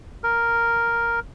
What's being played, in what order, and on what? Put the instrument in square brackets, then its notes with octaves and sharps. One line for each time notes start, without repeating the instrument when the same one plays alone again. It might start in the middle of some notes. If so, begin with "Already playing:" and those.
[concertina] A#4